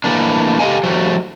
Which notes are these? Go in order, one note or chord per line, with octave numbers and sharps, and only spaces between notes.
E3 A3 A#3 D4
G4 A4 C5 D#5 F5 G#5
F3 G3 A3 F#4